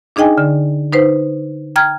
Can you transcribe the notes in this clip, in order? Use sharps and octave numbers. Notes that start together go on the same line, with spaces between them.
D4 D#4 G#4 D#5 G5 G#5
D3
D#4 B4 C5
G5 A#5 F6 G#6